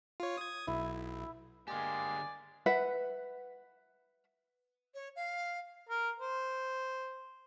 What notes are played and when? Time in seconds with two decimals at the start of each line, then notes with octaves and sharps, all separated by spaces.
0.20 F4 C#5
0.37 D#6 G#6
0.67 B1 E4
1.68 D3 G#3 A#3 G4 D5 G#5
2.66 B4 E5 F#5
4.94 C#5
5.15 F5
5.89 A#4
6.19 C5